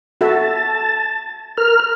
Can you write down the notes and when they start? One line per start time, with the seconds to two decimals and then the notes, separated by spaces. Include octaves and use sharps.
0.21 F#4 A4 E5 A5
1.57 A#4 F6